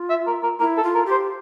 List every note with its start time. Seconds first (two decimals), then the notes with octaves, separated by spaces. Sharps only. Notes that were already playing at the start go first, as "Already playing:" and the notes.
Already playing: F4
0.10 E5
0.27 A#4
0.43 A#4
0.60 E4 A#4
0.77 A4
0.83 F4
0.95 A#4
1.06 G4
1.11 C5